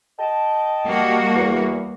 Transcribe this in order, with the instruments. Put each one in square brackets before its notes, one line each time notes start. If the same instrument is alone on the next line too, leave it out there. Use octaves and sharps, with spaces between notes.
[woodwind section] D#5 G5 A5
[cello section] G3 A#3 F#4
[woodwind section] E2